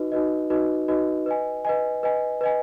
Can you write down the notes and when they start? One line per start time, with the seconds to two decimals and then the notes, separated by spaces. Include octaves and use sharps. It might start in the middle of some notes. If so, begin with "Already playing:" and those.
Already playing: D#4 F#4 B4 D#5
0.12 D#4 F#4 B4 D#5
0.50 D#4 F#4 B4 D#5
0.88 D#4 F#4 B4 D#5
1.26 B4 D#5 G#5
1.65 B4 D#5 G#5
2.03 B4 D#5 G#5
2.41 B4 D#5 G#5